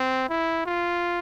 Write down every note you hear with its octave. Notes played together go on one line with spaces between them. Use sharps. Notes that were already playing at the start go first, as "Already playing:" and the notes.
Already playing: C4
E4
F4